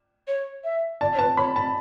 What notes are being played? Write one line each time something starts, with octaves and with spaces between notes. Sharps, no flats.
C#5
E5
D5 A5
C#5
B4 A5
C#5 B5
A5 B5